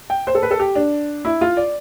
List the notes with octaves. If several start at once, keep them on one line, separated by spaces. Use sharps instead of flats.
G5
C5
A4
B4
A4
G4
D4
E4
F4
D5